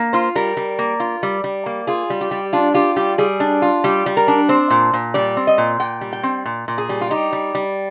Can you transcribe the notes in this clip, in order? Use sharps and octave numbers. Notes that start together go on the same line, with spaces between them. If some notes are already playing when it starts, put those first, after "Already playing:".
Already playing: A#3
F4 C5
G3 A#4
G3
A#3
F4
G3
G3
A#3
F4 G#4
G3
G4
G3
D4 F4
F4 G4
G3 G4
G3 G#4
D4
F4
G3 G4
G3
A#4
D4
C4 C5
A#2
A#2
G3 D5
C4
D#5
A#2
A#2 G5
G3
G5
C4
A#2
A#2
G#4
G3
F4
D#4 G4
G3
G3